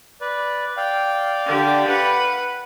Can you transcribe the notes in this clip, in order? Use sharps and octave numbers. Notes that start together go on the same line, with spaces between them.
B4 D5
D5 F5 G5
D3 G4
B4 F#5